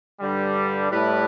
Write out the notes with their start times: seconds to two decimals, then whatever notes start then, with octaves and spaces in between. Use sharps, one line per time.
0.20 G2 D3 G3
0.89 A2 G3 E4 B4